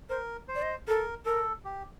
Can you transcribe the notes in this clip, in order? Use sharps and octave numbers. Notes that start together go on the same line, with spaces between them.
A#4 C5
C5
D5
D#5
A4 A#4
A4 A#4
G4